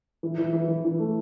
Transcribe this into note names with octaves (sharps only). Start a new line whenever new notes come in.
E3
E3
E3
E3
E3
A3